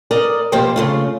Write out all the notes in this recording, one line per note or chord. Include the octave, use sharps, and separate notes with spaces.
A#4 D5 D#5
B2 F3 A#3 G4 C5 G5
C#3 A3 F4